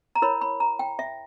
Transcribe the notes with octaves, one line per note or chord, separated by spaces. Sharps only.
A#5
E4 A#4 C#5 B5
B5
A#5
G5
E5